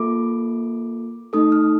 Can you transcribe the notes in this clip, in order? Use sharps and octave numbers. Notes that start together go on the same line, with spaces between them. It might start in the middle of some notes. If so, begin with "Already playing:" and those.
Already playing: A#3 F4 A4 D6
A3 D#4 A4 D#6
F6